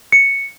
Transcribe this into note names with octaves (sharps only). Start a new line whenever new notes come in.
C#7